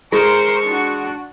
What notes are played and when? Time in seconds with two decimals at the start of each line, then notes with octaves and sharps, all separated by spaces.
0.12 G#3 A#4 C5 C#6
0.63 D4 F#4